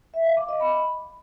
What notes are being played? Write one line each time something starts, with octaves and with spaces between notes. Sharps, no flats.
E5
F5
D6
D#5
B5